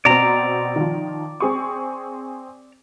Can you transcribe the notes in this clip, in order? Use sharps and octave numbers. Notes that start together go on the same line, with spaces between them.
B2 C4 D5 A#5
D#3 F3
C4 G#4 C#6